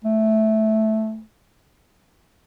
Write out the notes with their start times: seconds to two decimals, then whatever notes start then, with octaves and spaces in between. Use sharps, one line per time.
0.05 A3